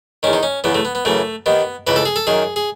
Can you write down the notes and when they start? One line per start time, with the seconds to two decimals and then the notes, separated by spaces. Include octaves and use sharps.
0.23 E2 D#3 C#4
0.33 D#4
0.43 C#4
0.64 E2 C#3 E3 B3
0.75 A3
0.85 B3
0.95 B3
1.05 F#2 C#3 E3 A3
1.46 D#2 D#3 B3
1.87 C#2 C#3 E3 B4
1.96 A4
2.05 G#4
2.16 A4
2.27 F#2 D#3 G#4
2.56 G#4